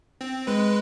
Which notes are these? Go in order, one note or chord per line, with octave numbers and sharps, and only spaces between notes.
C4
G#3 B4